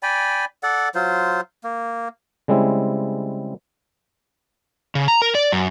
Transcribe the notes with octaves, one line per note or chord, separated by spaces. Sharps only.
D5 G5 G#5 B5
A4 D5 F#5
F#3 F4 C5
A#3
C#3 G3 G#3 C4 E4
C#3
A#5
A#4
D5
F#2